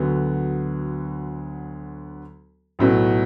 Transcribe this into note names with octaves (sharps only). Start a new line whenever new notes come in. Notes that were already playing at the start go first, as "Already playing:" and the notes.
Already playing: D2 D3 F#3 B3
B1 A2 F#3 B3